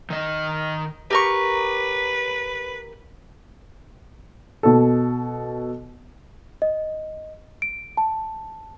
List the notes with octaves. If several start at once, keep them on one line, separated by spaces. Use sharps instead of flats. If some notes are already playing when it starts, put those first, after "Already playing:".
D#3 D#5
G4 A#4 B4 C#6
B2 A4
D#5
D7
A5